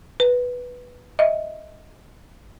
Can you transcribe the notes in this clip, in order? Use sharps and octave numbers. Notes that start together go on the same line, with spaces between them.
B4
D#5 E5